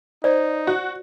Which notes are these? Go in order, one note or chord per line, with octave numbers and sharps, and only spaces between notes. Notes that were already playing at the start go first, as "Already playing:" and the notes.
D#4 C5 D5
F#4